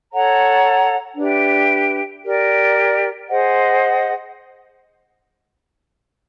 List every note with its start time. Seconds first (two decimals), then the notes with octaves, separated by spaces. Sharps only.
0.11 A4 C#5 F#5 A#5
1.16 D4 G4 B4 E5
2.23 G4 A#4 D5
3.28 G#4 C5 D#5 F#5